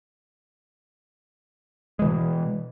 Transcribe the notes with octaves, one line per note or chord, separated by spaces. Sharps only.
B2 E3 G#3